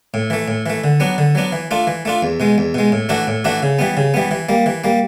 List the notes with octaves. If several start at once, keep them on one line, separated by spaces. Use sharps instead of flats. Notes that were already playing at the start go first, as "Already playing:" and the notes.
A2
E3 A3
A2
E3 A3
D3
F#3 B3 D4
D3
F#3 B3 D4
E3
A3 D4 F4
E3
A3 D4 F4
E2
B2 G#3
E2
B2 G#3
A2
E3 A3 D4 F#4
A2
E3 A3 D4 F#4
C#3
E3 G3 B3
C#3
E3 G3 B3
E3
G3 A#3
E3
G3 A#3